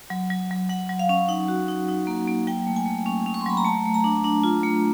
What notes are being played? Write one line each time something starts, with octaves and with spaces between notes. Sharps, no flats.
F#3
F#3
F#3
F#3 F#5
F#3
F5
C#4
D#4 F#5
F#4
D#4
D#4
A#3
A#3
F#3 G5
A3
G#5
A3
C#4
C#4
C#6
C6
F#3 B5
A#5
A3 A5
A3
A#5
D4
D4
F4
A3